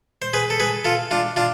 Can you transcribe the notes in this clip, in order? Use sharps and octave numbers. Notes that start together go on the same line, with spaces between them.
C5
G#4 B4
A4
G#4 B4
F4 A4
D4 F4
D4 F4